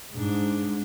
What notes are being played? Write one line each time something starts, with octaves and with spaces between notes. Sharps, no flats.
G#2 D4